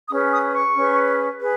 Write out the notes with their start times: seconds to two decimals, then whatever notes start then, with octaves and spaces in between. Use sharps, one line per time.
0.08 C#4 G#4 B4 D#6
0.32 D#6
0.53 C#6
0.75 C#4 G#4 B4
1.40 G#4 B4